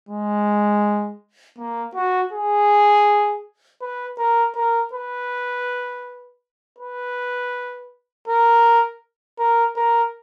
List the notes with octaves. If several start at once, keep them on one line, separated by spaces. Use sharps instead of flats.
G#3
A#3
F#4
G#4
B4
A#4
A#4
B4
B4
A#4
A#4
A#4